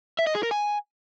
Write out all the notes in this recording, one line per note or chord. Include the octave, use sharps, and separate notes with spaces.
E5
D#5
G#4
A#4
G#5